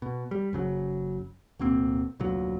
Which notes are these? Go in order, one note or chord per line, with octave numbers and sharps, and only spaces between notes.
B2
G3
F#1 C#3 F#3
D1 B2 A#3 C4
F1 D2 A#2 F#3